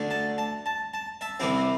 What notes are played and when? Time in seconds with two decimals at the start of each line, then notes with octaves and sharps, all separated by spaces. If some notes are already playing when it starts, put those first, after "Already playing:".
Already playing: D2 D3 A3 D4
0.11 A5
0.38 A5
0.66 A5
0.94 A5
1.21 E5 A5
1.40 C2 C3 E3 C4 E4 G4